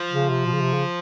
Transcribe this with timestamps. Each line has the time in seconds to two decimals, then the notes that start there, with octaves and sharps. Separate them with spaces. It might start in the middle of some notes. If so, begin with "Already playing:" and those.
Already playing: F3
0.13 C#3
0.29 C3
0.46 B2
0.54 C#3
0.61 C3
0.74 C#3